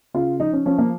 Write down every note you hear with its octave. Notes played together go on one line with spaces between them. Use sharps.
C#3 F4
F3 D#4
C#4
F3 C#4
A#3